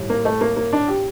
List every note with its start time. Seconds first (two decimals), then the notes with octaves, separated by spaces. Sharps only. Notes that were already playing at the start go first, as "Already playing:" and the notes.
Already playing: A2 G3
0.10 A#3
0.25 A3
0.41 A#3
0.56 A#3
0.73 D4
0.88 G4